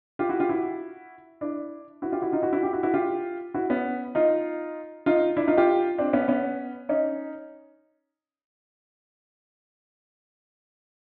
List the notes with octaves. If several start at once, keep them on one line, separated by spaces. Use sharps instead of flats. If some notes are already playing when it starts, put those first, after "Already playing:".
F4 G4
E4 F#4
F4 G4
E4 F#4
D4 E4
E4 F#4
F4 G4
E4 F#4
D#4 F4
E4 F#4
E4 F#4
F4 G4
E4 F#4
E4 F#4
F4 G4
E4 F#4
B3 C#4
D#4 F4
D#4 F4
D4 E4
D#4 F4
F4 G4
C4 D4
B3 C#4
B3 C#4
C#4 D#4